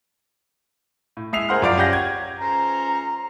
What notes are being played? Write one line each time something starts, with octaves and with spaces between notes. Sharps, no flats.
A2
G#3 E5 D#6 C7 F7
G#4 A#4 C5 F#5 C6 F6
F#2 F3 D5 F5 D7
C#4 G4 F#5 G6 A#6
G#6
C#2 C#4 C5 A#5